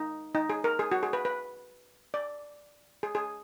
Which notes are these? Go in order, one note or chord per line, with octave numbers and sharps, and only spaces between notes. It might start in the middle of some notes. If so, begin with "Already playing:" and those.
Already playing: D#4
D#4
G#4
A#4
G#4
F#4
G#4
B4
B4
D5
G#4
G#4